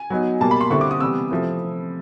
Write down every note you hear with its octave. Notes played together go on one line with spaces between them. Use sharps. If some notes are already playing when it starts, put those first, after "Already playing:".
Already playing: G#5
F#3 B3 D#4
B2 G3 A#3 A5
B5
C6
D3 G3 C4 E4 C#6
D6
D#6
C3 E3 G3 B3 E6
C3 F3 A3 C4 E4